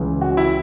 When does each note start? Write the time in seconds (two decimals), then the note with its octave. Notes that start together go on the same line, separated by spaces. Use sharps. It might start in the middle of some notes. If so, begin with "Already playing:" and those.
Already playing: C#2 C#3 E3
0.21 F#4
0.37 E4